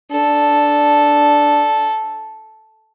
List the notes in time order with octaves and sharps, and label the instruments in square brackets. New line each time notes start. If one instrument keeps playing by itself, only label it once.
[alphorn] D4 [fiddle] A4